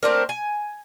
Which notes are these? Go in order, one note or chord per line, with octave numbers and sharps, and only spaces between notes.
A3 C4 D4 A#4
G#5